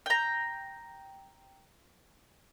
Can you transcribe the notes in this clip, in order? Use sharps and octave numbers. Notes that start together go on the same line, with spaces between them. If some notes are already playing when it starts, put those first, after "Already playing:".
G5 A#5